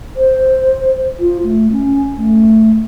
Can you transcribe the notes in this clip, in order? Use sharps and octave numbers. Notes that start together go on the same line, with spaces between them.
C5
F4
A3
C#4
A3